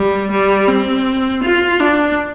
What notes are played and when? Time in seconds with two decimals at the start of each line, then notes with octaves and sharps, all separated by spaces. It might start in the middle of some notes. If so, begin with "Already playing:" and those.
Already playing: G3
0.31 G3
0.68 C4
1.44 F4
1.80 D4